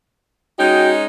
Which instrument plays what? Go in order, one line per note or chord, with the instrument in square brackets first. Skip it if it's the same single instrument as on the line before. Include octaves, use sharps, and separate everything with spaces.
[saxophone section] G#3 C#4 D#4 [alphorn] F#4 [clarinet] G5